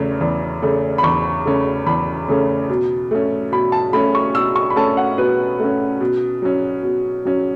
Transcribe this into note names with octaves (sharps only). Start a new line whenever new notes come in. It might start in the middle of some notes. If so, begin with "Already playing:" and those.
Already playing: E2 C#3 A3 C#4
E2
C#3 A3 C#4
B5
E2 C#6
C#3 A3 C#4
E2 B5
C#3 A3 C#4
B2
A3 C#4
B2 B5
A5
A3 C#4 B5
C#6
B2 E6
C#6
B5
A3 C#4 A5
F#5
B2 B4
A3 C#4
B2
F#3 C#4
B2
F#3 C#4